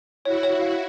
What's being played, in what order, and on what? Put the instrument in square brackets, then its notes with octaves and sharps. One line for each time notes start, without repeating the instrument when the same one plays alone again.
[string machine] E4 F#4 [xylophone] C#5
[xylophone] C#5
F5